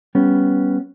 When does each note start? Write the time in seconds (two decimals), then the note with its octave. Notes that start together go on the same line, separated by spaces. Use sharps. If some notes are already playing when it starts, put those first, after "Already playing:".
0.15 G3 B3 C#4